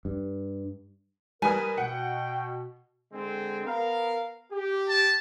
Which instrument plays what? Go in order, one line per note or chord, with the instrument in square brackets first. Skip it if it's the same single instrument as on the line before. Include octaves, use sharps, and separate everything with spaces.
[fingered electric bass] G2
[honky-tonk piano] G3 B4 D#6 [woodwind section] A#4 [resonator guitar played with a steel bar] G#5
[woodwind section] B2 [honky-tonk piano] F#5 [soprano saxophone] G5
[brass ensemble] D3 G#3 C4
B3 A#4 F5
G4
[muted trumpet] A5